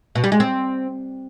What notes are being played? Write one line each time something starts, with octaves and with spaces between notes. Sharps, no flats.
B2
G3
G#3
C4